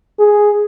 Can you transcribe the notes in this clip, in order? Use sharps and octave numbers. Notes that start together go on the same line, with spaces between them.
G#4